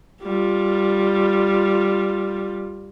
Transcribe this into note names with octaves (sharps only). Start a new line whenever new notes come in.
G3 F4